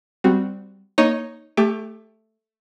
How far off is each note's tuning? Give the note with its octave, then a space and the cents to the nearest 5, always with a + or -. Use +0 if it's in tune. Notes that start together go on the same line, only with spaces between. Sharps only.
G3 +0 C4 -15 F#4 +0
A#3 +0 D#4 +0 C#5 +0
A3 +0 G4 +30 D6 -30